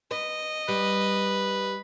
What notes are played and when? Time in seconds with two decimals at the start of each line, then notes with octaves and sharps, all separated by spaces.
0.11 B4 D#5
0.68 G3 B4